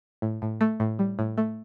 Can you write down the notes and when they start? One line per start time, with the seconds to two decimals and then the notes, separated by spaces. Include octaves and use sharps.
0.22 A2
0.42 A2
0.61 A3
0.80 A2
0.99 G3
1.19 A2
1.38 A3